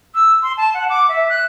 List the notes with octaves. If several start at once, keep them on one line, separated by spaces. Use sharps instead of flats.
E6
C6
A5
F#5
D6
E5
F#6